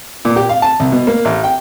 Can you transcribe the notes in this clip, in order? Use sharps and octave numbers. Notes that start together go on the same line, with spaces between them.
A#2
G4
F5
A5
C2
B2
A#3
A1
G5